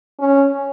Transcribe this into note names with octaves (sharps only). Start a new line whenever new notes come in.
C#4